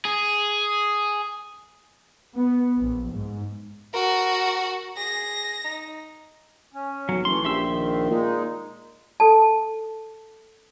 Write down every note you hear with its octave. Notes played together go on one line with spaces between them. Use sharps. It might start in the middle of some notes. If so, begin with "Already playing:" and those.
G#4
B3
A#1
G#2
F#4 A#4
G#4 A#6
D#4
C#4
B1 F#3
F#1 E3 A3 C6
A#1 G4 E5 C6 E6
D#3
A#2 G#3 D#4
A4 A5